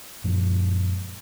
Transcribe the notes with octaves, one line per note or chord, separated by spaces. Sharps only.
F#2 A#2 F3 G#3